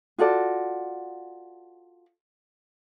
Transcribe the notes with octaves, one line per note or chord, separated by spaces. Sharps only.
F4 F#4 A4 D5